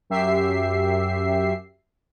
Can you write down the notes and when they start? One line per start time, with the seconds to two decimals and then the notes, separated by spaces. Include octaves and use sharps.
0.10 F#2 G4 E5 C7